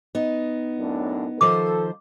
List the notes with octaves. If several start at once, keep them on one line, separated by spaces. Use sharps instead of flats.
B3 D#4
F#2 A2 D4
D#3 F3 A4 C5 D6